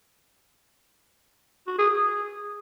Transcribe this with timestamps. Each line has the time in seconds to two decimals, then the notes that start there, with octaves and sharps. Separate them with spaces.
1.67 F#4
1.79 G#4
1.90 G#4